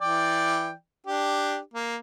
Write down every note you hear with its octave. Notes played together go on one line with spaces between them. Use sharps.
E3 D5 G5
D4 G4
A#3